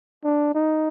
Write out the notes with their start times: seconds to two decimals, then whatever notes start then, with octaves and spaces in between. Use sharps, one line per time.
0.24 D4
0.55 D#4